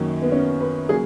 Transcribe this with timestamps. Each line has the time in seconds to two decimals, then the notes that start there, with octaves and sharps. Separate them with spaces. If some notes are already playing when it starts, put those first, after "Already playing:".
Already playing: F#2 D#3 F#3 A#3 C#4
0.22 B3
0.32 C#4
0.60 B4
0.89 C#3 F#3 A#3 G#4